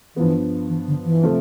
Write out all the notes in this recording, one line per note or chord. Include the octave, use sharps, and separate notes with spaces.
G2 E3 F3 B3
E3
D3
E3
C3 F3 A3